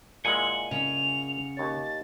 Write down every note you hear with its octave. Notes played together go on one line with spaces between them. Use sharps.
A#2 G#3 E4 F#5 G#5 F#7
C#3 F7
D#2 C#5 A6